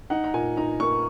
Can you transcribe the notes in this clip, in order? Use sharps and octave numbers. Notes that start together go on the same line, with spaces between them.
D#4 F#5
A#5
A#2 G#5
D#4 A#5
A#3 C#6